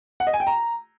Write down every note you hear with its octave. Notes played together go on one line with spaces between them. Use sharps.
F#5
D#5
G#5
G5
A#5